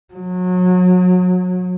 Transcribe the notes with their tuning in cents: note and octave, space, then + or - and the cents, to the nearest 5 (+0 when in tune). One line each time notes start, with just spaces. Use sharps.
F#3 -30